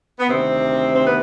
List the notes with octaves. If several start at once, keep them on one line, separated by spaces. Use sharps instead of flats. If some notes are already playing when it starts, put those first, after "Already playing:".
B3
D2 C3 D#3 C4
C4
B3